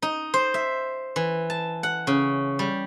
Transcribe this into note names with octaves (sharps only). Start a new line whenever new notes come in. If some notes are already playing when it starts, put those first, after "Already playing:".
D#4
C5
E5
E3
A5
F#5
C#3
G3